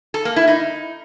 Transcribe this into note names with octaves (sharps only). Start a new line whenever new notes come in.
A4
A#3
E4
D#4